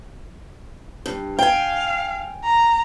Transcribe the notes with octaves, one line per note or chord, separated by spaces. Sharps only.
G2
F5 G5 G#5
A#5